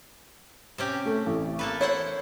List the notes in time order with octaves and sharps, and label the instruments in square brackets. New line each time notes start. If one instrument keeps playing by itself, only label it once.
[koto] C3 C#4 G4
[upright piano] A3
A1
[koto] A#3 A4 B4
[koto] E4 C5 F#5 [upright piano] C#5